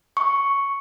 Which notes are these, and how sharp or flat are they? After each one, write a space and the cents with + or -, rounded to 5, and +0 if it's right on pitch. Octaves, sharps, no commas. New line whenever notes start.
C#6 +0